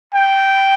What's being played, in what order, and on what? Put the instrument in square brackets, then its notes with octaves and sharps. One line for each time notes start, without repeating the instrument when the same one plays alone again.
[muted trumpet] G5